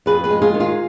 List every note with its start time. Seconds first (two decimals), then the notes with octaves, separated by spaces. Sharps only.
0.06 F2 G#4 B4
0.24 G#4 B4
0.30 G#3
0.42 F4 G#4
0.54 D#3
0.60 F4 G#4